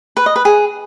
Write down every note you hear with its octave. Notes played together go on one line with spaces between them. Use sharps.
B4
D#5
B4
G#4